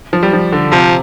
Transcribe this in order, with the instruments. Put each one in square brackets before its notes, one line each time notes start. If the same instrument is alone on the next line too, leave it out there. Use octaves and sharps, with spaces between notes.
[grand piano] F3
G3
F3
D3
[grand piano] C3 [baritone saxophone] F3